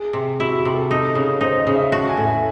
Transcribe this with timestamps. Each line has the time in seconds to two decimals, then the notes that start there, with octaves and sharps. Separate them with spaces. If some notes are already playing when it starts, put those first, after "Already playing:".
Already playing: G#4
0.13 C3
0.40 E4 F#4
0.65 C3
0.74 A4
0.91 D#4
1.15 C#3
1.41 D#4 C5
1.58 D#5
1.67 C#3
1.75 E5
1.92 F#4 A5
2.09 G#5
2.17 A2
2.25 E5